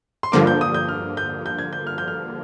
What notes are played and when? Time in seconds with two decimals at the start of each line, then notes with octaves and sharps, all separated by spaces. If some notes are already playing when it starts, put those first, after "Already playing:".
0.23 C6
0.32 G2 D3 F3 A#3 D6
0.47 G6
0.61 D#6
0.74 G6
0.89 F6
1.17 G6
1.46 G6
1.59 G#6
1.73 G6
1.87 F6
1.98 G6
2.08 F6